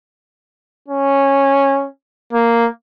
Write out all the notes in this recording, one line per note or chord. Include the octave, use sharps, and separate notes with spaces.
C#4
A#3